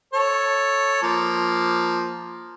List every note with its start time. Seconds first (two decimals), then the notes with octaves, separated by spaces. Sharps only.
0.13 A4 C#5
1.03 F3 A#3